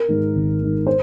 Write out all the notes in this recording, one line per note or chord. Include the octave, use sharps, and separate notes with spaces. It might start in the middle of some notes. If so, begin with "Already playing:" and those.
Already playing: A#4
G#2 D#3 G#3
G#1
G#2 D#3 G#3
C5